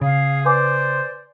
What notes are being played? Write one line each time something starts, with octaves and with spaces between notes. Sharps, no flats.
C#3 G#4 F5
B4 C5 D5 G#5 D6